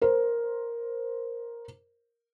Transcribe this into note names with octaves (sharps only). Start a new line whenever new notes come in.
A#4 C5